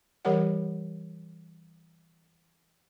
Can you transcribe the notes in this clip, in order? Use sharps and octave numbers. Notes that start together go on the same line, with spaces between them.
E3 G3 G4 A#4 C#5 F#5